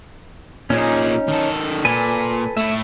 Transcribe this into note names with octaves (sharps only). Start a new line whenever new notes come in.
A#2 C#4 D#4 G#4
D#3 A4
A#2 A4 B4 G#5
A3 E4 E5